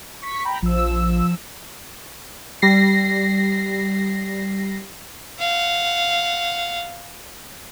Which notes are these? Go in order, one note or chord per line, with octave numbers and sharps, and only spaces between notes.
C#6 B6
G5 A#5 B5
A#1 F3 E6
G3 A#6 C7
F5 F#5